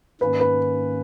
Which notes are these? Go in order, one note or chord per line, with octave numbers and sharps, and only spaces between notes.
G#2 D#3 A#3 C#4 B4
B4